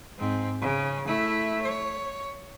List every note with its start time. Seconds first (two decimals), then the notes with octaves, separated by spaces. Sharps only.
0.19 G#2 C4
0.61 C#3
1.07 A3 E4
1.62 C#5